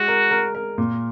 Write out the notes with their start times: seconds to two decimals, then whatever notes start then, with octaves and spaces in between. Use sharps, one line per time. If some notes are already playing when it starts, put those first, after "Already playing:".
Already playing: G#3 F#4
0.08 A#4
0.31 A#4
0.55 A#4
0.78 A#2